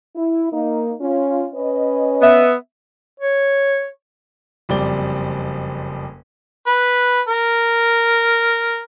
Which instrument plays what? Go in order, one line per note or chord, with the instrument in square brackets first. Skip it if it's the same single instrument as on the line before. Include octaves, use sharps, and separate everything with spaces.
[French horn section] E4
A#3 D#4
C#4 F4
C#4 B4 D#5
[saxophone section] B3 E5
[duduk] C#5
[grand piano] F#1 F2 G3 C4 D5 G7
[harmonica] B4
A#4